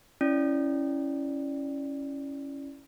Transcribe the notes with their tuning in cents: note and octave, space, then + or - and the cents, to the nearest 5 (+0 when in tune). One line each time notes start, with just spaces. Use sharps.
C#4 +0 E4 +0 D5 +5